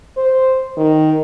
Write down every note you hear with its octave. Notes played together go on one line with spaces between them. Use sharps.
C5
D#3